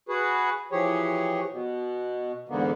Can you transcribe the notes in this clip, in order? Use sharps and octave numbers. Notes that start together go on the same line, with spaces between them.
F#4 G#4 B4
E3 F3 G4 G#4 C#5
B2
E2 G#2 D3 A#3 B3